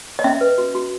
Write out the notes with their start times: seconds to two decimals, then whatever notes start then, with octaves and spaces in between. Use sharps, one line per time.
0.19 D#5
0.24 C#4 E5
0.41 B4
0.58 F#4
0.75 F#4